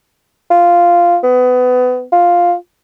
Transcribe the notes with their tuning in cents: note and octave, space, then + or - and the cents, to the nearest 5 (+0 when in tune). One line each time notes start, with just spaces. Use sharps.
F4 -5
B3 +25
F4 +5